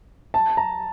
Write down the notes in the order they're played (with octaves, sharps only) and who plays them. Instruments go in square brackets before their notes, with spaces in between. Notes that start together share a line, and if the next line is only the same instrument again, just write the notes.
[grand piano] A5
A#5